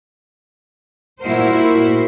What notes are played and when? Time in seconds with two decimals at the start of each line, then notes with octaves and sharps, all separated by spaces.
1.21 A#2 E4 F#4 A#4 C5